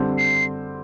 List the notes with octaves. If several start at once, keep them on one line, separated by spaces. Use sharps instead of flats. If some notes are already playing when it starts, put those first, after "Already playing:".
Already playing: D3 G3 C4
C7